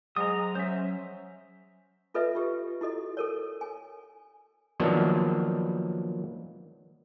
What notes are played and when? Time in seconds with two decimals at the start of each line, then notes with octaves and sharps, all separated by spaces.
0.16 F#3 G#3 C5 A#5 D#6
0.55 F#3 C#4 C5 E5
2.14 F4 A4 B4 D#5 E5
2.35 F4 G4
2.81 E4 F#4 A4 D#5
3.17 A4 A#4 C#5
3.61 G#5
4.80 D#3 F3 F#3 A#3 B3 D4